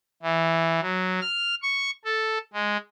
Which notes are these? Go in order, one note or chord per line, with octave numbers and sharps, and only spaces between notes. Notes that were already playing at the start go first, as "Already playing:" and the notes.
E3
F#3
F6
C#6
A4
G#3